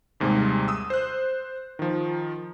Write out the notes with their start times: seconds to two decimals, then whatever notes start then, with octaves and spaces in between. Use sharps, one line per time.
0.20 D#2 G#2 C3 G3 G#3
0.68 D#6 E6
0.90 C5 F#6
1.79 D#3 F3